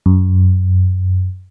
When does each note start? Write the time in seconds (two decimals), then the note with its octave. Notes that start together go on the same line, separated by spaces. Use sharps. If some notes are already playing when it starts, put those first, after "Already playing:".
0.06 F#2